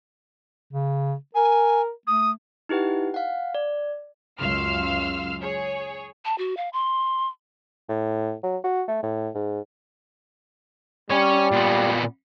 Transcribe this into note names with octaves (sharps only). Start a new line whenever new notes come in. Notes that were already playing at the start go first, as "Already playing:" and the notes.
C#3
A#4 G#5
A3 D#6
D#4 E4 G4 B4 F#5
F5 F#5
D5
C#2 F#2 F5 C6 E6 F6
G#4 C#5
A5
F#4
F5
C6
A2
F#3
F#4
A3
A2
G#2
G3 C#4 C#5
A#2 B3